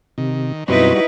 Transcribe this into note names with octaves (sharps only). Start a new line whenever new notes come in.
C3 D#3
F#2 B2 G3 C4 D#4 E4 F#4 B4